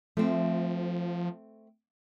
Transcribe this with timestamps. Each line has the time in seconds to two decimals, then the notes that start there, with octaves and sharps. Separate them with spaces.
0.17 F3 A3 C4